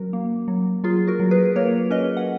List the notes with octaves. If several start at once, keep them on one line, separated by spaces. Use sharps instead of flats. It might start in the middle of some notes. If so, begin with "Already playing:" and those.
Already playing: F#3 C#4 F#4 A#4
A#3
F#3
F#3 F4 G#4
F#4 A#4
F#3
G#4 B4
A#3 A#4 C#5
C#4 B4 D#5
F#5